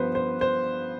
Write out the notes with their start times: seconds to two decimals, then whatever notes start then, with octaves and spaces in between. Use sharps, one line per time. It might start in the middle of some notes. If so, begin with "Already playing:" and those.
Already playing: G2 F3 B3 B4 C5
0.15 C5
0.41 C5